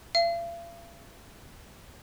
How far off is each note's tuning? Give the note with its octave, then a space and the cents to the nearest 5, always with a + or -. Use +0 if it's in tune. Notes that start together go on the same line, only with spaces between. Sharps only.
F5 -45